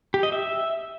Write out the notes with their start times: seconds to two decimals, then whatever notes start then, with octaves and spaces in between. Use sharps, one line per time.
0.14 G4
0.23 D#5
0.32 E5